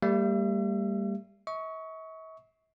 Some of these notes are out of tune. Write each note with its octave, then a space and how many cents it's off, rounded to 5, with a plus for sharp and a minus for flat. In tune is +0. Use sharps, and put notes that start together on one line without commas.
G3 +15 A#3 -40 E5 +40
E5 -45 C#6 +10